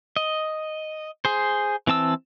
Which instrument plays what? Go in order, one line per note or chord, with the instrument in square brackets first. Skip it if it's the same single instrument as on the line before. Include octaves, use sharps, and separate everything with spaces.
[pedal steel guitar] D#5
G#4 C5
E3 C4 A5 E6